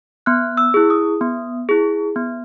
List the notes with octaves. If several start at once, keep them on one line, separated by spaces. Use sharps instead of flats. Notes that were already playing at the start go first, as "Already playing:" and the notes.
B3 F#6
E6
E4 G#4
D#6
B3
E4 G#4
B3